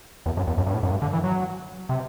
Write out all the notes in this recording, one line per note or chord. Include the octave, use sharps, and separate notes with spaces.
E2
F#2
E2
F#2
G2
A2
F#2
G2
D3
E3
F#3
C3